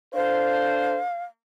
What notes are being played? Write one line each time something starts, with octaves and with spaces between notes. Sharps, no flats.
D4 A4 C5 F5